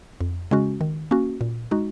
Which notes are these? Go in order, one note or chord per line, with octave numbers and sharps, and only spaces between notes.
F2
C#3 G#3 C#4 F#4
D#3
A#3 C#4 F#4
A#2
G#3 D#4 F#4